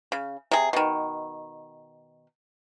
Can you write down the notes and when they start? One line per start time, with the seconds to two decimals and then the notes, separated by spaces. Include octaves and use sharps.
0.12 C#3
0.51 C3 G#4
0.73 B2 D#3